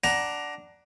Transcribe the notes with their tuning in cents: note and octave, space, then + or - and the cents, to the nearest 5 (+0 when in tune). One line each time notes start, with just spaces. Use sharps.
D4 +0 F#5 +10 A#5 +15